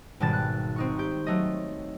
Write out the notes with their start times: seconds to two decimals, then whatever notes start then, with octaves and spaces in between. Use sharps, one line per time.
0.20 G#1 B2 G3 A5 A6
0.33 F#6
0.76 C4 D#4 C#6
0.99 G4 G6
1.26 F#3 A3 D#5